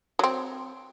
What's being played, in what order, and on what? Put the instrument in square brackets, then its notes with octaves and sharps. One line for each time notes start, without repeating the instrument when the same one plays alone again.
[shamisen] F#3 C4